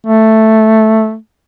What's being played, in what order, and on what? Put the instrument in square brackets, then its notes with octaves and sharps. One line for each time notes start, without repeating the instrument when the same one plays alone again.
[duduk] A3